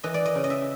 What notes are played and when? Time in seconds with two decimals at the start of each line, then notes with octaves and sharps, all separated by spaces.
0.03 E3 D#5
0.14 D5
0.25 D#5
0.35 C#3
0.44 D#5
0.50 E5